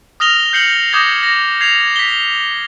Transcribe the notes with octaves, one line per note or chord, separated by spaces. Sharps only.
D#6 F6 A#6 F7 G7
G6 C7 C#7 F#7 G7
D6 D#6 G6 G#6 A#6
A#6
G#6 C7 F7
B6 G7